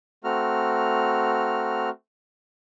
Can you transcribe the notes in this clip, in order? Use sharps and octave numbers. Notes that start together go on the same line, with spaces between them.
A3 C4 F#4 A#5 F6